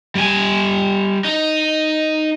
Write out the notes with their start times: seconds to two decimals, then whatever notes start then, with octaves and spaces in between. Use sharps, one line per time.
0.15 G3 G#5
1.25 D#4